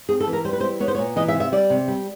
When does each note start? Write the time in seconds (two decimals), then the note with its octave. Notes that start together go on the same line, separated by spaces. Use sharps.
0.09 C4 G#4
0.20 A4
0.27 E3
0.33 A#4
0.45 G3 C5
0.53 B4
0.60 E4 C5
0.80 B3 C#5
0.88 C5
0.95 C#5
0.98 A#2
1.16 E3 D#5
1.28 E5
1.34 C3
1.40 E5
1.52 G3 D5
1.70 C3
1.88 G3